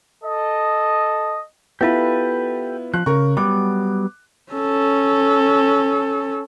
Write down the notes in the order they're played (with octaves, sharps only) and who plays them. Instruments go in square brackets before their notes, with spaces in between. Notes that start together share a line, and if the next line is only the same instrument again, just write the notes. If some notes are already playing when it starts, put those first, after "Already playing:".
[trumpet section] A4 D#5
[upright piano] B3 E4 F4 [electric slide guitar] G4 A4 B4
[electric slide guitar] F3 [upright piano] F#6
[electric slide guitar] C#3 [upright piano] A#4 C#6
[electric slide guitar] F#3 G3 B3 [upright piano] D6
[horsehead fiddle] C#4 A4